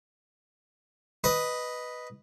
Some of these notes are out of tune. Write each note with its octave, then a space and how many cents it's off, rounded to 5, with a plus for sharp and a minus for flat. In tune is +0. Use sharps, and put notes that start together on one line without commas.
B4 +0 D#5 +0